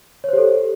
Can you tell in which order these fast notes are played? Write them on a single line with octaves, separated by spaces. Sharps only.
C#5 C5 G4 A4